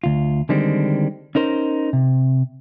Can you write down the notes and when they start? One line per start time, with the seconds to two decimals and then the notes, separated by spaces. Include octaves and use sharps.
0.04 D2 F4
0.49 D3 D#3 G3 G#3 C4
1.35 C#4 D#4 A#4 C5
1.93 C3